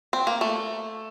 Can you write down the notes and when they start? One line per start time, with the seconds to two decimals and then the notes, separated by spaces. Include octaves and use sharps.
0.13 C4
0.27 A#3
0.41 A3